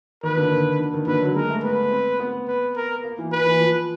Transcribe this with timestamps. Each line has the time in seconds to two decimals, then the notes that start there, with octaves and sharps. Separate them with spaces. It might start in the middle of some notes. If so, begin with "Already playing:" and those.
0.23 D#3 B4
0.37 D3
0.52 D#3
0.79 D3
0.94 D#3
1.07 D3 B4
1.22 F#3
1.35 G#3 A#4
1.50 A3
1.63 B3 B4
1.91 C4
2.20 B3
2.48 B4
2.76 A#4
3.04 A#3
3.18 E3
3.32 E3 B4
3.46 E3
3.60 F3